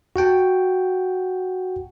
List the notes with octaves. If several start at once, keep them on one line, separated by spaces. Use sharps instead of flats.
F#4 F#5 G5 A5